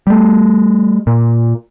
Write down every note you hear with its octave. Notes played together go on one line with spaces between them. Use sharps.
G3 A3
A#2